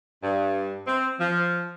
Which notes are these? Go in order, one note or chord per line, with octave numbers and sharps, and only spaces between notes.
G2
C4
F3